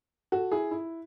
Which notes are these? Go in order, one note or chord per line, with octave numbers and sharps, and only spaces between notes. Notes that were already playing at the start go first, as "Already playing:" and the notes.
F#4 A4
E4 G#4
E4